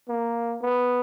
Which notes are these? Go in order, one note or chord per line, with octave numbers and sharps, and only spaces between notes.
A#3
B3